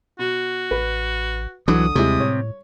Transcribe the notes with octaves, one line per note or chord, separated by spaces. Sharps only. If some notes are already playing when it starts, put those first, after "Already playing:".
B2 F#4
A1 B4
C2 D3 E3 F#3 D#6
D#2 C3 G3 G#3 E4
A2 C#5